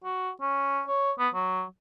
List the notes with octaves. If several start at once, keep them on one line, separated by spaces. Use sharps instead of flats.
F#4
C#4
C#5
B3
F#3